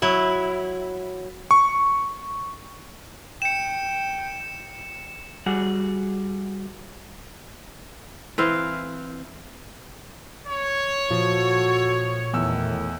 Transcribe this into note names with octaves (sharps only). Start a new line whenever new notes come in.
F#3 E4
C#6
G5 C#7 E7
G3 F#4 G#4 F#5
E3 C4 F5
C#5
A#2 F3 F#4 A4
E2 A2 D#3 E6